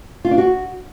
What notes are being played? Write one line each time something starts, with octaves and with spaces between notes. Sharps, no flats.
F4
D4
F#4